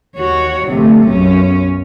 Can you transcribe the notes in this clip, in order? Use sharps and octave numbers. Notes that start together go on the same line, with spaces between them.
D#2 F#4 C#5
G1 C3 F3 A3
B1 F#2 C#4